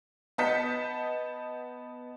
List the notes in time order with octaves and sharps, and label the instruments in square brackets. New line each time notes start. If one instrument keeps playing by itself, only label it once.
[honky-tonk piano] B3 D#5 A5 G6 B6 C#7